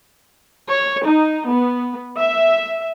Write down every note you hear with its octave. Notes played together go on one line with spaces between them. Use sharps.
C#5
D#4
B3
E5